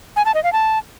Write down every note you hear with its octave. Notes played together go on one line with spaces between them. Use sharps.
G#5
A5
D#5
F5
A5